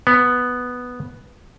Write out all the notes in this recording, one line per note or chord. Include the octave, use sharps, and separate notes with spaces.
B3